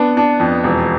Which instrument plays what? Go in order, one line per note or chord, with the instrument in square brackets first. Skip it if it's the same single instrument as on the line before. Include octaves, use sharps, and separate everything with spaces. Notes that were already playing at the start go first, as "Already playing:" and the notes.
Already playing: [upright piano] B3 D4
D4
F2
E1